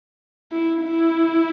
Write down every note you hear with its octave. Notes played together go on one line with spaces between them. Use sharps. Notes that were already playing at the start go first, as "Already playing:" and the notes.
E4
E4